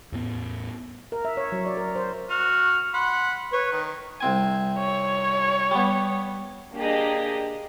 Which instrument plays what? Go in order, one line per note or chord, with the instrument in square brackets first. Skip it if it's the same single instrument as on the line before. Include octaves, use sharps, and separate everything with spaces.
[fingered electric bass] E2 A2 B3
[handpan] A#4
E5
C#5
F#3
D5
A#4
C5
[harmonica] F#4 [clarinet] F6
[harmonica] F#5 B5 [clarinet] C6
[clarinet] B4 [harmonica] C#5
[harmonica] D#3
[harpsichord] C2 C4 G#5
[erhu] C#5
[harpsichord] G3 B3
[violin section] A#3 D4 G4 G#4 D#5